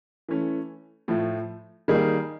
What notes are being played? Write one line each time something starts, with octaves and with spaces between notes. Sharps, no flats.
E3 A3 C#4
A2 F3 A3
D#3 G3 A#3 D#4 G#4